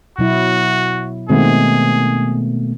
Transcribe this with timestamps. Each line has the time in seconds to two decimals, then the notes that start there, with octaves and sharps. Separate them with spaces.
0.19 B2 F#3 E4 F#4
1.29 B2 D#3 G#3 A3 B3 C4 G#4